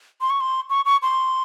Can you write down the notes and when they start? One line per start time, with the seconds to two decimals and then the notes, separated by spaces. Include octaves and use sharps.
0.21 C6
0.30 C#6
0.40 C6
0.70 C#6
0.85 C#6
1.02 C6